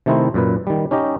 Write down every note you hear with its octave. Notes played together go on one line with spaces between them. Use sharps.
C3 D#3 A3 D#4 E4 C5
F#2 A#2 B4
D#3 G3
C#4 D#4 G4 D#5